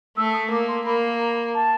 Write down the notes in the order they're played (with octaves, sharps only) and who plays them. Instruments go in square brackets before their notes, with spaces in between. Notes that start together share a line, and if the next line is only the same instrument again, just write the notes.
[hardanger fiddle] A3 [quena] E6
[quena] D#6
[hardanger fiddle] A#3 [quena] D6
[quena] C6
[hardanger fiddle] A#3 [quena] B5
[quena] A#5
A5